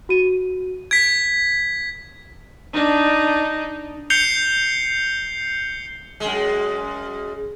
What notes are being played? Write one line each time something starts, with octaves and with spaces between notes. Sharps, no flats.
F#4 D#7
G#6 B6 D7
D4 D#4
G6 C7 C#7 F7 G7
F#2 G#3